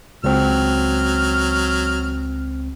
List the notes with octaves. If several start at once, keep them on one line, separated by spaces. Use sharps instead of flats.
C#2 F#3 C4 F6